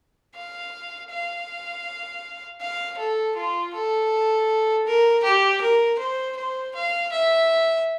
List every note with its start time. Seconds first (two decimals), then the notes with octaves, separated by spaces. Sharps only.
0.35 F5
1.10 F5
2.61 F5
2.98 A4
3.36 F4
3.74 A4
4.86 A#4
5.24 G4
5.61 A#4
5.99 C5
6.37 C5
6.75 F5
7.12 E5